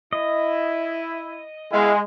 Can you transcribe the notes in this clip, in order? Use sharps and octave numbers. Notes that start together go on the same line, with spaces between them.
E4 D#5
G#3 B3 E4 F5